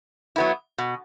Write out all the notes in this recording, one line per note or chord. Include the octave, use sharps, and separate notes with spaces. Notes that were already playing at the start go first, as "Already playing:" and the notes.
F#3 B3 E4
B2